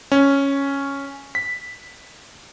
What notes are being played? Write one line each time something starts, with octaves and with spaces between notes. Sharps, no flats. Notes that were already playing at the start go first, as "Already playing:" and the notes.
C#4
B6